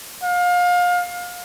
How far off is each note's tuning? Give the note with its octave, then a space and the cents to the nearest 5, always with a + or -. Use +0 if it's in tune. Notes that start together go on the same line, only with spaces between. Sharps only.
F5 +30